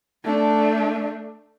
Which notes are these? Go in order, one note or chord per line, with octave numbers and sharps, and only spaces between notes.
A3 D4